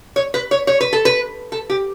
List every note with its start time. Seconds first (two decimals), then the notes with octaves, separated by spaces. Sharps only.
0.16 C#5
0.34 B4
0.51 C#5
0.67 C#5
0.81 B4
0.93 A4
1.05 B4
1.52 A4
1.70 G4